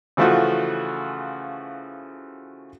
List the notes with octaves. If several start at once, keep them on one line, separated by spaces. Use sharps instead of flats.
C#3 E3 F3 A3 F4 F#4